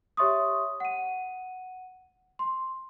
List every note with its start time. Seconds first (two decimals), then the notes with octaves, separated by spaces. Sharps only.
0.17 G4 C#5 E5 C6 C#6 D#6
0.80 F#5 D#7
2.39 C6